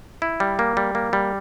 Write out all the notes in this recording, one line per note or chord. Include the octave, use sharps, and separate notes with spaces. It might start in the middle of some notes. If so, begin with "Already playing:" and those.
E4
G3
A#3
G3
A#3
G3